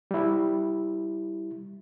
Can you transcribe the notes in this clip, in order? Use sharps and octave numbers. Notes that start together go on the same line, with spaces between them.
G3 E4